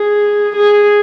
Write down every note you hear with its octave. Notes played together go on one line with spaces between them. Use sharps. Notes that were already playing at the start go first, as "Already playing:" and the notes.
Already playing: G#4
G#4